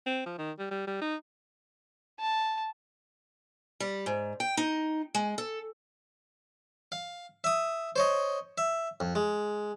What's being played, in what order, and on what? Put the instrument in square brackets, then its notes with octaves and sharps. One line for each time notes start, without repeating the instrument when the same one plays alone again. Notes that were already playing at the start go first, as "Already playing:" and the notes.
[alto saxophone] C4
F3
D#3
G3
G3
G3
D#4
[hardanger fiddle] A5
[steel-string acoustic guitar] G3
G#2
G5
D#4
G#3
A4
[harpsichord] F5
E5 D#6
C5 C#5 D#5
E5
F2
G#3